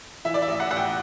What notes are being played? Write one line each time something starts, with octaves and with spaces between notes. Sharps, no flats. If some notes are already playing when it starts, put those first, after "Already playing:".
E3 E5
D5
E5
A1
F#5
A1 F#5
G5